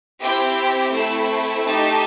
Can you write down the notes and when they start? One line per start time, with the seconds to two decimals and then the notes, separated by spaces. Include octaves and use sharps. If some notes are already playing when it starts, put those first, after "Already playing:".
0.20 C4 E4 G4 G5
0.93 A3 C4 E4
1.66 A3 D#4 G4 A5